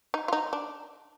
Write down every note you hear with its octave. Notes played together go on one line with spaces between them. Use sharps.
D#4
F4
D#4
D4